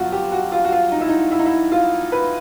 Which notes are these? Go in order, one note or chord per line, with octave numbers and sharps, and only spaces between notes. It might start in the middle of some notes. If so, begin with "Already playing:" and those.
Already playing: G2 D3 F#3 B3 F4 F#4
G4
F#4
F4
F#4
F4
D#4
E4
D#4
E4
D#4
E4
F4
B4